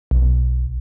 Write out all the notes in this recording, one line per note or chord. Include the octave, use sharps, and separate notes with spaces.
B1